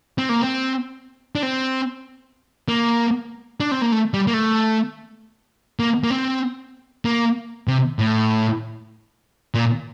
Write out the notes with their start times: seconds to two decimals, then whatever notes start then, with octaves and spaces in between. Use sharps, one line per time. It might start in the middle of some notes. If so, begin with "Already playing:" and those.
0.18 C4
0.29 A#3
0.41 C4
1.35 D4
1.43 C4
2.68 A#3
3.60 D4
3.71 C4
3.82 A#3
3.92 A3
4.14 G3
4.27 A#3
4.34 A3
5.79 A#3
6.04 A#3
6.10 C4
7.05 A#3
7.68 C3
7.99 A2
9.54 A#2